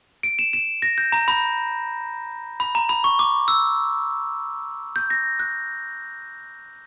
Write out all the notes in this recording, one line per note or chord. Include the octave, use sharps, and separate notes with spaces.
D7
E7
E7
A#6
G6
A#5
B5
B5
A#5
B5
C#6
D6
E6
G6
A#6
F#6